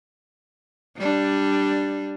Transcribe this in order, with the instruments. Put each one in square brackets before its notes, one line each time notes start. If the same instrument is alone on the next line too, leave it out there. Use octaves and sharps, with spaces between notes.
[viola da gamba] G3 D4